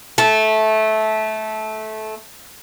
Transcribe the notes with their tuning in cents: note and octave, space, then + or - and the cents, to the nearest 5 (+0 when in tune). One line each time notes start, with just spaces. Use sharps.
A3 -15